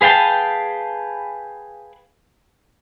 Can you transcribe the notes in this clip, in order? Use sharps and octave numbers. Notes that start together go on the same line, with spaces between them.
G#4 B4 F5 G5 A5